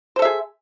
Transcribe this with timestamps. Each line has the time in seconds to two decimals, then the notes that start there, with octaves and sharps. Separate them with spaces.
0.16 C5
0.19 A4
0.22 E5
0.25 G#4